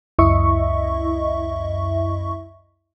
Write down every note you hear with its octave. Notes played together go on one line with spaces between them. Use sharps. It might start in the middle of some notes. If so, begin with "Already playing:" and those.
C#2 F#2 E4 D#5 E5 C#6